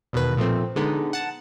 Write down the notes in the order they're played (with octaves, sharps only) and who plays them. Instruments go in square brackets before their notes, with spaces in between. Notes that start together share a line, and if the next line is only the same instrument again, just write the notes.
[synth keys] E2 B2 D#3 B4
A#2 F3 A3 C4
D3 G#3 B3 D#4
F#5 A5